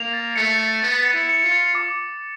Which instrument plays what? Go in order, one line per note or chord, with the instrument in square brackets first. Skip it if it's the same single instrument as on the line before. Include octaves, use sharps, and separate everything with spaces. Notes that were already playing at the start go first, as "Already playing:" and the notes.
Already playing: [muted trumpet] A#3 [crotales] F7
[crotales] A6
[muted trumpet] A3 [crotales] C#7
[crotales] A6
[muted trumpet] B3 [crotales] A6
[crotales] C#7
[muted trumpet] E4
[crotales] C#7
[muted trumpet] F4
[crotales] C#7
D6